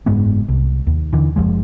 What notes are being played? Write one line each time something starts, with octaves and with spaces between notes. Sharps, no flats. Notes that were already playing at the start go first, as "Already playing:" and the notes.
F#1 G#2 G#3 B3
C2
D#2
D3 E3
F#1 D2 F3 G#3